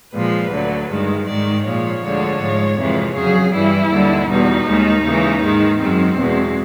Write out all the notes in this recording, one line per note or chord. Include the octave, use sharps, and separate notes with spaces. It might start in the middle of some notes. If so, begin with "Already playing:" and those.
A#2 F3 G#3 B4
D2 D3 F#3
G2 D#3 G#3
G#2 D#3 G#3 D5
A#2 F3 G#3 C#5
D2 D3 F3 G#3
G#2 F3 G#3
F2 C3 E3 G#3
F2 C#3 F#3 G#4
G2 E3 G3 E4
D#2 D3 G3
E2 B2 G3 D#4
D#2 D#3 G#3
D#2 C#3 E3 G#3
G#2 D#3 G#3
F#2 D#3 G#3 C4
E2 B2 G#3